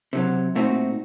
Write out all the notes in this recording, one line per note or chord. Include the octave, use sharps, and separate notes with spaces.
C3 D#3 F#3
A#2 A3 C4 D#4 F#4